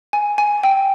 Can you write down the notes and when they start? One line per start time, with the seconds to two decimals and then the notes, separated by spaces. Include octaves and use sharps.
0.13 G#5
0.38 G#5
0.64 G5